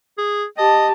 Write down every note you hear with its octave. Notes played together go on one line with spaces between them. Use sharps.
G#4
G4 D#5 A5